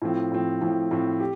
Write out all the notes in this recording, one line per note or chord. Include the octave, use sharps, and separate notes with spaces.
A2 F3 C4
A2 F3 C4
A2 F3 C4
A2 F3 C4
G4